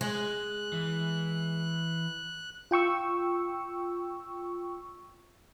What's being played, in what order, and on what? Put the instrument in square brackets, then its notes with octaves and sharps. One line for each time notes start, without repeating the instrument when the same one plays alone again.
[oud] G#3 [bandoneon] F#6
[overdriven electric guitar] E3
[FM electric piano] F4 G5 C#6 E6